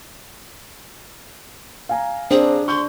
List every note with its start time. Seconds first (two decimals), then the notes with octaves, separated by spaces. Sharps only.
1.89 F5 G#5 A#5
2.31 C4 D4 G#4
2.68 C6 C#6 G6